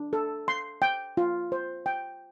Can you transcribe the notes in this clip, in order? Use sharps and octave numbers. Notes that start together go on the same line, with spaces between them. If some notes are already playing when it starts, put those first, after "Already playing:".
Already playing: D4
A4
C6
G5
F4
C5
G5